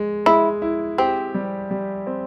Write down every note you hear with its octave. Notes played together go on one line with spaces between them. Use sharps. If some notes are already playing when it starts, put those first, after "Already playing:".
Already playing: G#3
G#3 E4
E4
C4 G4
G3
G3
C4